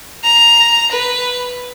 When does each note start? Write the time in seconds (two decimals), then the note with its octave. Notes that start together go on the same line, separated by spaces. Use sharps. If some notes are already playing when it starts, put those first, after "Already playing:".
0.24 A#5
0.91 B4